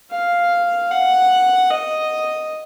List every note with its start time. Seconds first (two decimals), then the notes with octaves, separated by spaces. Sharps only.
0.11 F5
0.91 F#5
1.70 D#5